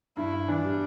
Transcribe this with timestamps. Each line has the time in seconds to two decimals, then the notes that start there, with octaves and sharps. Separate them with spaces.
0.17 G2 E4
0.33 G2
0.48 E3 D4
0.64 G3